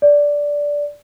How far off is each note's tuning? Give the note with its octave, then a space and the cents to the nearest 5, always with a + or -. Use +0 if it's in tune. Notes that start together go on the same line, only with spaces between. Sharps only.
D5 -10